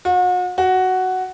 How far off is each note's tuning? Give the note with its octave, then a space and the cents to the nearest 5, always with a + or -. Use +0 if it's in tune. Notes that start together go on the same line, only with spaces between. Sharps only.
F#4 -40
F#4 +5